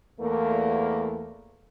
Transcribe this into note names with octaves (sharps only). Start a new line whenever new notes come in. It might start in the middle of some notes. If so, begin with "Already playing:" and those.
E2 A3 A#3